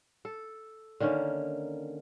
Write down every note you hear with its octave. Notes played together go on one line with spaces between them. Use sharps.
A4
D3 D#3 A#3 C#4